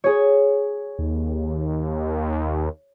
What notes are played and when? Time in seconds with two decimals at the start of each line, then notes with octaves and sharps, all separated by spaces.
0.04 G#4 C#5
0.99 D#2